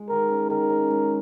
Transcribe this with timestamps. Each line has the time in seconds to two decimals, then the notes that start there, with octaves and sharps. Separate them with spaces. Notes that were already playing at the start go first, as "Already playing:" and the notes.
Already playing: G#3
0.09 D#3 A#4
0.30 C#4
0.50 D#3 A#4
0.70 C#4
0.90 G#3